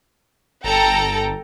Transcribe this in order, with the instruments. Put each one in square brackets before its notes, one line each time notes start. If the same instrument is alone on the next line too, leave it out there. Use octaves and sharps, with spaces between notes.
[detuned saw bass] G1 [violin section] A4 G5 A#5